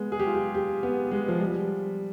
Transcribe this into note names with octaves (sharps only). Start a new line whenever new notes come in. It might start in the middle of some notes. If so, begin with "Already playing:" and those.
Already playing: G#3 B3
G#4
G4
F4
G4
G4
B3
G#3
F3
G3